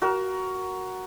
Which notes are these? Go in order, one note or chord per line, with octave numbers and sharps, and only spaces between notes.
F#4 A#4